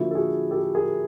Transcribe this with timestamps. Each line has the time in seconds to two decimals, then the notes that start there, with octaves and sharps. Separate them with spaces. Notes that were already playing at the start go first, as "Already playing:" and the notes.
Already playing: D3 F3 A#3 E4 F#4
0.11 A4
0.15 F#4 G#4
0.51 G4 A4
0.75 G#4 A#4